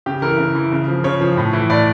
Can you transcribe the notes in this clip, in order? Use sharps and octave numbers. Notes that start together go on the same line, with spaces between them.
C#3 G4
E3 A#4
C#3
E3
C#3
F3
C#3 C#5
F3
A2
E3
A2 D5